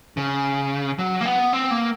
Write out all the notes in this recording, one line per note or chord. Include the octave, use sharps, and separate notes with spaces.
C#3
F#3
A#3
B3
C4
A#3